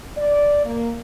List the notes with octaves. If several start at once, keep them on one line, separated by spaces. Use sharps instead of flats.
D5
A#3